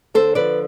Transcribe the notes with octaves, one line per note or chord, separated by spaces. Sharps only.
D3 A4 C5
F3 B4 D5